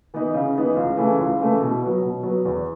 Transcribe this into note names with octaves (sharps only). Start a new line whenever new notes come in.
E3 B3 D#4
C#3
E3 B3 D#4
C#2
C#3 E3 A3
C#2
C#3 E3 A3
B2
F#3 B3
B2
F#3 B3
E2